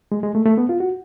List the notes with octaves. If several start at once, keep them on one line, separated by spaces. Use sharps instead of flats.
G#3
G#3
A3
A3
B3
F4
F#4